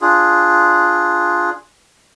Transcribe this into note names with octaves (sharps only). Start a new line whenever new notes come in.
D4 F4 G#4